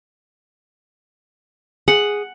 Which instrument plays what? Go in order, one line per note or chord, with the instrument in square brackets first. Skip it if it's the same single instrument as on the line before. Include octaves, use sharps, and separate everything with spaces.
[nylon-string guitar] G#4 [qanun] F#5